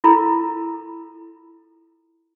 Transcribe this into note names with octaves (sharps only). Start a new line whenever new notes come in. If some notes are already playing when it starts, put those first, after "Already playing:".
E4 F4 A4 A#4 A#5 B5